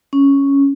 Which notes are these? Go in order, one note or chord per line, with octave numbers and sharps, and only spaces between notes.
C#4